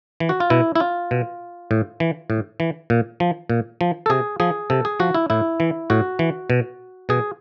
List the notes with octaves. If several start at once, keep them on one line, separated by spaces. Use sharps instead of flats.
E3
F#4
F4
B2 E4
E4
F4
B2
A2
E3
A2
E3
A#2
F3
A#2
F3
A4
C3 G#4
F3 G#4
C3 A4
G#4
F3 F#4
E4
A2 E4
E3
A2 F#4
E3
B2
B2 G#4